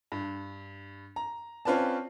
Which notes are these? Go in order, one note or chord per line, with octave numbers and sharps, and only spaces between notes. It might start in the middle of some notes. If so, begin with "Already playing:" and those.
G2
A#5
C4 C#4 F4 B4 D5 A5